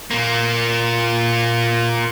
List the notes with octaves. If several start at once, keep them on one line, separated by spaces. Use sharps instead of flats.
A#2 A#3